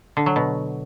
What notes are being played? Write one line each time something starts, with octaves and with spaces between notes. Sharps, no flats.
D3
F#3
B2